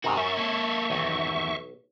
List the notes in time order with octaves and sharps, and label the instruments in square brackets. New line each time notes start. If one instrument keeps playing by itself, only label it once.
[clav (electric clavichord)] G#2 C3 D#3 [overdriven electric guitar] F#4 A#4
[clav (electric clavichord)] C#4 [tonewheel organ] E5 C#6
[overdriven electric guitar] A#3 A4
[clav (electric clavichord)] B1 [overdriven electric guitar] E2 D#3